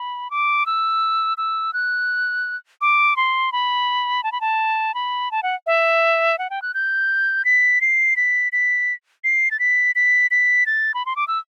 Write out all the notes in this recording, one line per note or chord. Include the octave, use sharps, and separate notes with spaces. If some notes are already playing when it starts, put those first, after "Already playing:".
Already playing: B5
D6
E6
E6
F#6
D6
C6
B5
A5
B5
A5
B5
A5
F#5
E5
F#5
G5
F#6
G6
B6
C7
B6
B6
C7
A6
B6
B6
B6
A6
B5
C6
D6
E6